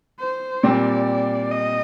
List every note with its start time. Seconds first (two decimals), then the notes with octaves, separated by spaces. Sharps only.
0.20 C5
0.63 A#2 G3 C4 D5
1.51 D#5